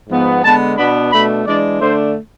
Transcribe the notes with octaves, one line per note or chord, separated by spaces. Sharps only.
G#2 F3 B3
D3 G#3 B3 A5
B2 B3 D4 B5
B2 A3 D4 B5
E3 G#3 D4 D5
D3 A3 D4 C5